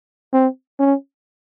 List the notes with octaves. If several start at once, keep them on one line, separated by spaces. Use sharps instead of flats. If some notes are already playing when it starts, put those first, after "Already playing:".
C4
C#4